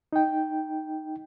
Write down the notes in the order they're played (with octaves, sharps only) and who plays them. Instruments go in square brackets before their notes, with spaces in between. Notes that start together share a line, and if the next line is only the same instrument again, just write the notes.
[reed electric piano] D#4 G5